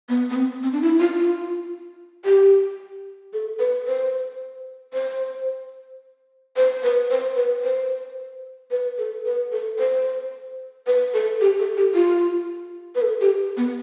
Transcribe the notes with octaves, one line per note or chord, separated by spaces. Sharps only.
B3
B3
C4
C4
D4
E4
F4
F4
G4
A4
B4
C5
C5
C5
B4
C5
B4
C5
B4
A4
B4
A4
C5
B4
A4
G4
A4
G4
F4
B4
A4
G4
B3